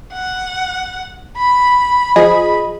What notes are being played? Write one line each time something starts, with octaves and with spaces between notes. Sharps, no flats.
F#5
B5
F3 G#4 D#5